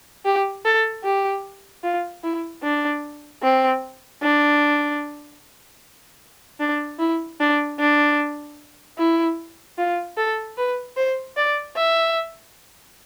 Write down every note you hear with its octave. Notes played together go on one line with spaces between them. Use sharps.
G4
A4
G4
F4
E4
D4
C4
D4
D4
E4
D4
D4
E4
F4
A4
B4
C5
D5
E5